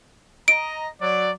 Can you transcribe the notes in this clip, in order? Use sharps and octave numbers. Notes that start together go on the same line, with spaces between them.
D#5 A#5 D7
F#3 D5